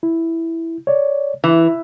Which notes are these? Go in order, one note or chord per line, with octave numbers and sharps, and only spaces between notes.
E4
C#5 D5
E3 E4